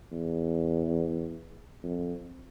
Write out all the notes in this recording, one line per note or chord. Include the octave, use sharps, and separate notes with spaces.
E2
F2